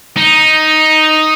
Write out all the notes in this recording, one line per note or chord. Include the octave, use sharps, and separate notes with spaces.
D#4